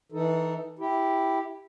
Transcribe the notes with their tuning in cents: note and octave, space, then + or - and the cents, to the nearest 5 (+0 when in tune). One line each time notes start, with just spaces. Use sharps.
E3 -20 D#4 +0 A4 +5
E4 +0 G4 +0